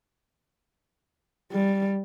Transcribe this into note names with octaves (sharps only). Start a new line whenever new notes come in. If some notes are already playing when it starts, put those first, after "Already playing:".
G3